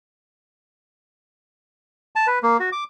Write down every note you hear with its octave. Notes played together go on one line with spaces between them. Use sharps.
A5
B4
A#3
F#4
D6